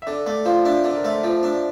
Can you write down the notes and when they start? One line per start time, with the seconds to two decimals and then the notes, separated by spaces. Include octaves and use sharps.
0.02 E5
0.07 D3 D5
0.26 A3 D5
0.45 F3 C5
0.65 D4 E5
0.84 D3 D5
0.95 A#4
1.04 A3 C5
1.23 F3 D5
1.43 D4 E5